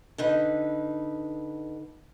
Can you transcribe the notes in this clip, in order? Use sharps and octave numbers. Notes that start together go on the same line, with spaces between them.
D3 D#4 B4